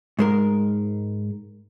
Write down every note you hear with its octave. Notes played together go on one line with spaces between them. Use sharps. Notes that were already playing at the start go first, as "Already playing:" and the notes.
G#2 G#3 A#4